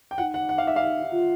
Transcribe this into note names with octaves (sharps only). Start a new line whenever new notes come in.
G5
F4 F#5
D#4
F#5
F#5
F5
E5
F5
F4